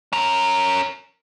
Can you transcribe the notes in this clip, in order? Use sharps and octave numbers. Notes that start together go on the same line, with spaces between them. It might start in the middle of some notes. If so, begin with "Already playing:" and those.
C#4 A#4